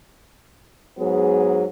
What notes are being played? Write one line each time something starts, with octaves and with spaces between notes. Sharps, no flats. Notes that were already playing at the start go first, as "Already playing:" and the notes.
G#2 F#3 B3 G#4